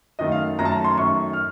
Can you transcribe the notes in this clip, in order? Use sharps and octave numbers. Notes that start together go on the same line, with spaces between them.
F#2 D#3 A3 D#5
F5
F#2 D#3 A3 A#5
A5
A#5
C6
F#2 D#3 A3 C#6
F6